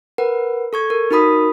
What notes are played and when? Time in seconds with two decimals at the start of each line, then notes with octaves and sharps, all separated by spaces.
0.18 A#4 B4 F#5
0.73 A4 C#6 G#6
0.90 A#4
1.11 D#4 F#4 A#4 B5 D#6 B6